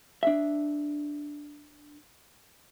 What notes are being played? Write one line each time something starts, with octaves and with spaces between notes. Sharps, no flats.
D4 E5